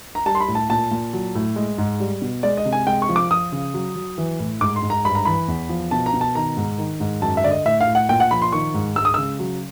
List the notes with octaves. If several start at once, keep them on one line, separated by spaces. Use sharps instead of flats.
A#5
G3 A5
C6
B5
A2
A5
A#2 A5
A#2
F#3
A2
G#3
G#2
G3
B2
G#3 D5
D#5
C3
G#5
G#3 G5
C#6
F3
D6
F3 D#6
C#3
F#3
F#3
E3
A2
G#2 D6
C6
G#2
A#5
G2 B5
A#5
E3 B5
E2
F3
B2 A5
A#5
B2
A5
D#3 A#5
G#2
D#3
G#2
F#2 A5
E5
D3 D5
D#5
A2 E5
F5
A2
F#5
A#2 G5
F#5
F3 B5
C6
D#3 C#6
G#2
G#3 E6
D#6
C#3 E6
F#3